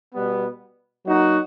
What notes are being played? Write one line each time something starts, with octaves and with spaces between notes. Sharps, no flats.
B2 G3 B3
F#3 A#3 D#4 F#4